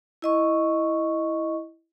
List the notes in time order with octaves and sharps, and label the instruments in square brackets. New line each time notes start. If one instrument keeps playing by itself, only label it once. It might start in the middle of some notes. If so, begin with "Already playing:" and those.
[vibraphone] E4 D#5 C#6